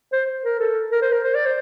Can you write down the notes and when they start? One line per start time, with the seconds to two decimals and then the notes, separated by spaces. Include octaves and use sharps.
0.13 C5
0.45 A#4
0.60 A4
0.92 A#4
1.02 C5
1.12 A#4
1.24 C5
1.35 D5
1.46 C5